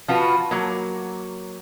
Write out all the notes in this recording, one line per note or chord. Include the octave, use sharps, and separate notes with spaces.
F3 F4 F#4 B4
F#3 A#3